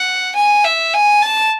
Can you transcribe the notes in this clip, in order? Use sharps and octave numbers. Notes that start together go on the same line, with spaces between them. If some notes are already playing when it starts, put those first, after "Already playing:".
Already playing: F#5
G#5
E5
G#5
A5